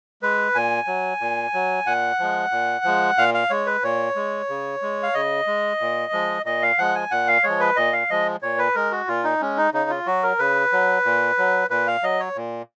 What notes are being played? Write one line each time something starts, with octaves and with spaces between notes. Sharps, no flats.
G#3 B4
A#2 G#5
F#3
A#2
F#3
A#2 F#5
F3 G#3
A#2
F3 G#3
A#2 F5
F5
G#3 C#5
B4
A#2 C#5
G#3
C#3
G#3
F5
C#3 D#5
G#3
A#2
F3 G#3
A#2 D#5
F5
F3 G#3 F#5
G#5
A#2 F#5
F5
F3 G#3 C#5
B4
A#2 D#5
F5
F3 G#3 D#5
A#2 C#5
B4
G#3 A#4
F#4
A#2 F4
D#4
G#3 C#4
D#4
C#3 D#4
F4
F#3 F#4
A#4
C#3 B4
F#3
A#2
F#3
A#2 B4
F5
F#3 D#5
C#5
A#2